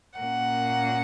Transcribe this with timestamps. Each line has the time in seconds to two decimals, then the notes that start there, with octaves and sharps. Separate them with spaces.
0.19 A#2 A#3 C#4 F#5